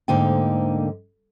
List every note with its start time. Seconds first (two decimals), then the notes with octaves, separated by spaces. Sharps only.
0.08 D2 G#2 D3 A#3 D#4 G5